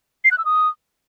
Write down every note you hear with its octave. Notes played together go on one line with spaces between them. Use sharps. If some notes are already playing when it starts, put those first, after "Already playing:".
C7
F#6
E6
D#6